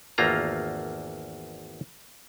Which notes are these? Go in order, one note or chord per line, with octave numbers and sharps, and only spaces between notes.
G#1 E2 A3 A#3 F4 A#5